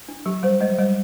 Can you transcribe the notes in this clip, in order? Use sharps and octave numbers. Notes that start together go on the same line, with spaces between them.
D4
F#3 G4
G3 C5
G#3 D#5
F#3
G3 D#5